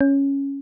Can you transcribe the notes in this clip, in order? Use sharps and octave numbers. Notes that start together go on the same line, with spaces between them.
C#4